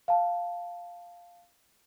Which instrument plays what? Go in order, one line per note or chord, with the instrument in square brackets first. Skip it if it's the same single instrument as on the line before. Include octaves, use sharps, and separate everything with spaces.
[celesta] F5 A5